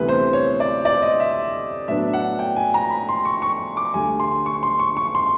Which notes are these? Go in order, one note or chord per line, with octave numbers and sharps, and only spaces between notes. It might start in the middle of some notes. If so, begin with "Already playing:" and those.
Already playing: D2 C3 E3 G3 B3 B4
C5
C#5
D5
D5
D#5
E5
A2 F#3 B3 D4 E5
F#5
G5
G#5
A#5
B5
C6
C#6
C#6
D6
D2 D3 G3 G#5
C6
C#6
C6
C#6
C#6
C6